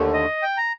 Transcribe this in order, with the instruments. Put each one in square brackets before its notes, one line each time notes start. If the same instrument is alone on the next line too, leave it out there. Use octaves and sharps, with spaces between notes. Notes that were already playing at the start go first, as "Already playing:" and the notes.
Already playing: [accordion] D#2 D3 A3
[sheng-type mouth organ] D#5
G5
A#5